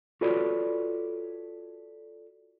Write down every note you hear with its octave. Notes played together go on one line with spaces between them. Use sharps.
F4 F#4 A4 B4 C#5 D5